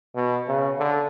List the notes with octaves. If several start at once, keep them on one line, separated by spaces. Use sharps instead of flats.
B2
C#3
D3